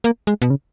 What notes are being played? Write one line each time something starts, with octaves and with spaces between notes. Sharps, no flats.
A#3
G#3
B2
C#3